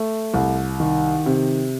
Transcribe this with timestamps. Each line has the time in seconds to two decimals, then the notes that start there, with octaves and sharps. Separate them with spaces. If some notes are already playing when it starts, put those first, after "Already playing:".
Already playing: A3
0.34 C2
0.80 D#3
1.26 C3